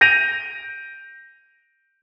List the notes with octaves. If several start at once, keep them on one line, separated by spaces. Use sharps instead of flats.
G6 A#6 D7 D#7 F7